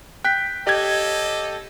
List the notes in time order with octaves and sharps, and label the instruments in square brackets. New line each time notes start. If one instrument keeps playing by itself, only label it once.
[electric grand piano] G5 [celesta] F#6 G6 B6
[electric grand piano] G4 G#6 [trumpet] A4 [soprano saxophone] D#5